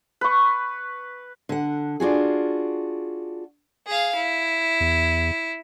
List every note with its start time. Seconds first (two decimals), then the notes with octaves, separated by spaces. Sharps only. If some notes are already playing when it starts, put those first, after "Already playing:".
0.21 B4 C#6
1.49 D3 F#5
2.00 D4 F4 F#4 G#4
3.87 G#4 F5
4.15 E4
4.80 E2